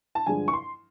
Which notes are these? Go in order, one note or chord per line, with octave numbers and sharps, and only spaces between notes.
A5
G2 D3 F3 G#3 G#5
C#6
C6